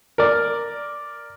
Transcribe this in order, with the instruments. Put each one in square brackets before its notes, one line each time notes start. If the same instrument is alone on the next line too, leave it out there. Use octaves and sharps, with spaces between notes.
[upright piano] A#4 D5